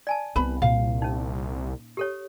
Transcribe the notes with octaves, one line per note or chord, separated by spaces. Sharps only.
D5 G#5 A5
C2 B3 C4 B4 B5
A#2 F5
C#4 D#4
G4 A4 C#5